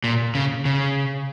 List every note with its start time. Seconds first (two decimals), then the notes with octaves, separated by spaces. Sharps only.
0.04 A#2
0.35 C#3
0.65 C#3